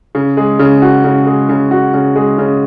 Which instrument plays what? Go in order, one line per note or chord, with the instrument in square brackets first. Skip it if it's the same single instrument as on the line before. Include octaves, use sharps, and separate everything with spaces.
[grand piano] C#3
G#3
C#3
F#4
C#3
G#3
C#3
F#4
C#3
G#3
C#3